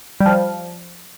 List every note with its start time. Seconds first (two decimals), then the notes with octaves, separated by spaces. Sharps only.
0.20 G3
0.26 F3